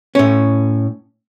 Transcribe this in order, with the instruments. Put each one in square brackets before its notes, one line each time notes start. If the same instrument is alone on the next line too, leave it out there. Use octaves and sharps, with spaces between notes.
[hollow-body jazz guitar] A2 C#4